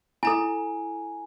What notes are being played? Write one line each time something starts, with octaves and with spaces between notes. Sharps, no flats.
E4 A4 G#5 A#5